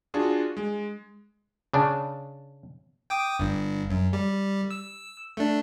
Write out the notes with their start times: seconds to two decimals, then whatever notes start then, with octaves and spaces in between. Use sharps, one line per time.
0.14 D4 F4 F#4 G#4
0.57 G#3
1.74 C#3 D4
3.10 G5 D6 D#6
3.39 G1 G2
3.90 F#2
4.13 G3
4.71 E6
5.37 A3 D4